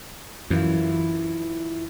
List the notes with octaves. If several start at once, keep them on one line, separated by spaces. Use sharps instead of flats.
F#2 E3 E4 F4